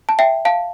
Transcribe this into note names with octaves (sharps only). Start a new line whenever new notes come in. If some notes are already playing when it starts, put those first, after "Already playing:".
A5
E5 G5
F5 A5